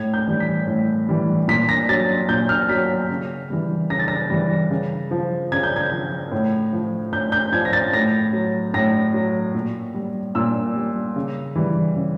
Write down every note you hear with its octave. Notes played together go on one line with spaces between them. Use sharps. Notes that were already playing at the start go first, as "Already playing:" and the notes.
Already playing: A2 G#6
G6
E3 G3
B6
A2
E3 G3
A#2 B6
A#6
F#3 A6
A#2 G6
F6
F#3 B6
C#3
E3 G3
C#3 A#6
A6
A#6
E3 G3
C#3
F3
C#3 G#6
G6
G#6
F3
A2
F3
A2 G6
G6
F3 G#6
A#6
A6
A2 A#6
F#3
A2 A#6
F#3
A#2
G3
A#2 E6
G3
C#3
E3 G3
C#3